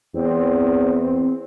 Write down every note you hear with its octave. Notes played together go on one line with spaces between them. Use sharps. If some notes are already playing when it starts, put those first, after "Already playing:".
E2 C4